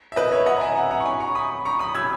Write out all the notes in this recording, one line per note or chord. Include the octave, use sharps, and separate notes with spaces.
E5
B4 D#5
C#5 E5
D#5 F#5
A#5
E5 G#5
F#5 A#5
F#5 A#5
C#6
G#5 B5
A#5 C#6
B5 D#6
A#5 C#6
B5 D#6
E6 G#6